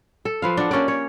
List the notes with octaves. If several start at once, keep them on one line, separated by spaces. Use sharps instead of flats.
A4
F3 B4 F5
D4 F#5
A#3 C#4 G4 D5
C#5